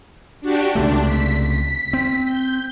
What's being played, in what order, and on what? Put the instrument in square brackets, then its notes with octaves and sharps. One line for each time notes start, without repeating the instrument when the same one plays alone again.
[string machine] D4 F#4 G4
[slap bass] C#2 C3 A3 [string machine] D4
[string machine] B6
[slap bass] C4
[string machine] G6